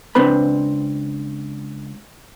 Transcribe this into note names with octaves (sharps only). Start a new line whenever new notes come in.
C#2 C4 D4 B4 B5